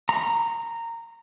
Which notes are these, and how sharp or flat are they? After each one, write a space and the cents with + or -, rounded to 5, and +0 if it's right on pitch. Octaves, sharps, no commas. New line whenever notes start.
A#5 -15